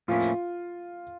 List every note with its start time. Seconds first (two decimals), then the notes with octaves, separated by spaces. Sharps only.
0.08 A2 F3 A#3 C#4 E4 F4